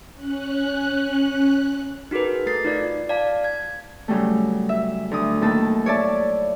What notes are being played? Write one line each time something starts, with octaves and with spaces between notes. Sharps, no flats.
C#4 F#6
D#4 F#4 G#4 A#4 B4
A3 A4 A6 C7
D#4 F4 D5
D5 F5 A5
G#6
C#3 F#3 G3 A3
E5
D2 D#6
D#2 A2 A3 A#3 A4 A5
C#5 D5 E5 A5